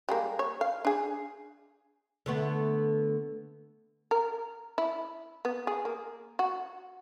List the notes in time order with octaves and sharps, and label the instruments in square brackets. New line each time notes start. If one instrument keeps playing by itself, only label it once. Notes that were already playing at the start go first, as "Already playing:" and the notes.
[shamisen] G3 G#3 A#3
C#5
F5
D4 G#4
[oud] D3 A3 B3
[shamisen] A#4
E4
B3
G#4
A#3
F#4